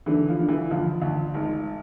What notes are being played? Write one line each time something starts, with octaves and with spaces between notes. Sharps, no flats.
D3 E3
F3
D3
E3
D2 F3
D2
G#1